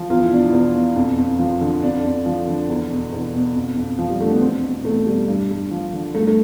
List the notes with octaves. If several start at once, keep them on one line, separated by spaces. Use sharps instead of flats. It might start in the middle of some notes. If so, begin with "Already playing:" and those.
Already playing: F3
E2 F4
E4
B2 D4
E4
E2
B2
F2
F2
F3
D3
F2 D4
F2
F3
D3
E2
B2
E2
B2
F2
F2
F3
G3
D3 A3
B3
E2 C4
B2
E2 A3
B2 G3
G2
G2
F3
D3
G2 A3
A3